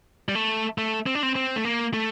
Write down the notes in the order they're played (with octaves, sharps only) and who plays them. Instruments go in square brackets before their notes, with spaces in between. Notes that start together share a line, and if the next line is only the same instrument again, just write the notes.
[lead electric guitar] G3
A3
A3
C4
D4
C4
C4
A3
A#3
A3